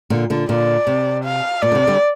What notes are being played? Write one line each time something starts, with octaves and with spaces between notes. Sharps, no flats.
A#2 D3
A#2 D3
A#2 D3 D5
C3
F5
A#2 D5
D3
C3
D3 G3